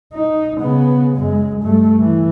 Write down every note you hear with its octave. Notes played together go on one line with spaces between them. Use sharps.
D#4
C#3 B3
F#2 G#3
G2 A3
E3